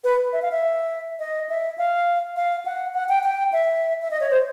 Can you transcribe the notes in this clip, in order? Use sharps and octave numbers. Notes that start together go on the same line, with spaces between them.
B4
E5
F5
E5
D#5
E5
F5
F5
F#5
F#5
G5
G5
E5
E5
D#5
C#5
C5